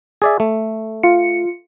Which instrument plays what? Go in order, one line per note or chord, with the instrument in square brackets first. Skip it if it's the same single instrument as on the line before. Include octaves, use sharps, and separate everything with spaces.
[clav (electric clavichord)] G#4 D5 E5
A3
[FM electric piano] F4 C#7